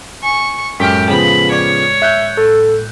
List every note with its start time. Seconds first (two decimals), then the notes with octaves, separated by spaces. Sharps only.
0.23 G#5 C#6
0.80 F#2 A2 G#3 G4 F6
1.09 C#3 F3 B3 B5
1.51 C#5 D5 D6 G#6
2.02 E5 F#6 G6
2.37 A2 A4